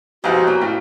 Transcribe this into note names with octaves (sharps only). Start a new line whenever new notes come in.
C2 F2 B2 D#4 F#4 B4 G5
A#3 C#4 G5
A2 F5